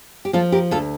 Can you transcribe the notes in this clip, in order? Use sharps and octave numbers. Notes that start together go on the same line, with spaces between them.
G4
F3 F4 A4
G4 A#4
D2 F4 A4